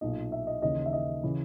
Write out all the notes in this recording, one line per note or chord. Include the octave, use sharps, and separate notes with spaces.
B1 A#2 D#5
E5
D#5
D#2 C#3 E3 D#5
E5
D#5
C#3 E3